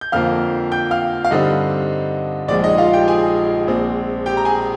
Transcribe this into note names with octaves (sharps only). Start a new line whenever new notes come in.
G6
F2 D3 F3 A#3 F5 F6
G5 G6
F5 F6
F5
G2 D3 G3 C4 D#4 D#5
A#1 A#2 F3 G#3 D5
D#4 D#5
F4 F5
G4 G5
G#4 G#5
A#1 A#2 G#3 C4
G4 G5
A#5
G#4 G#5